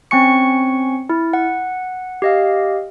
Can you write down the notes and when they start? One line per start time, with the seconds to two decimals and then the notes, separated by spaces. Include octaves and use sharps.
0.11 C4 C#4 G#5 C#6 C#7
1.10 E4
1.33 F#5
2.22 G4 D#5 F5